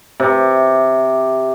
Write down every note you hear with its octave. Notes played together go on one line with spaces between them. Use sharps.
C3